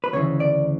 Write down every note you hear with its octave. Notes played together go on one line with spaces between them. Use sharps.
B4
D2 C#3 E3 C#5
D5